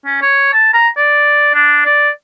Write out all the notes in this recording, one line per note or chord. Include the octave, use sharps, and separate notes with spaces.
C#4
C#5
A5
A#5
D5
D4
D5